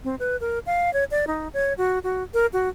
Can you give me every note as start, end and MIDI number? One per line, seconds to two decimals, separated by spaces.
0.04 0.15 60
0.19 0.37 71
0.40 0.59 70
0.66 0.92 77
0.93 1.04 73
1.11 1.25 74
1.27 1.48 63
1.54 1.73 73
1.78 1.99 66
2.04 2.23 66
2.34 2.46 70
2.53 2.69 66